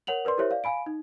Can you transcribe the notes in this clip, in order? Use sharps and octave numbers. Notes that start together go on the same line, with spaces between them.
A#4 C#5 F#5 F7 F#7
A#4 B4 D5 C6
E4 G4 A#4 C5 C#5 E5
D5 F5
F5 G#5 B5 D7
D#4